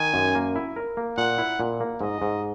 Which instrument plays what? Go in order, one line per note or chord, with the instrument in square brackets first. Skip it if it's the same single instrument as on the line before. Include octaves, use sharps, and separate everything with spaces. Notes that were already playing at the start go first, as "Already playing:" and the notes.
Already playing: [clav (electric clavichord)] D#3 [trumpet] G#5
[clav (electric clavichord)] F#2
A#3
E4
A#4
A#3
[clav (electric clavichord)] A#2 [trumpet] F#5
[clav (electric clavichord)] E4
A#2
A#3
[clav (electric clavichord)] G#2 [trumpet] D#5
[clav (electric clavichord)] G#2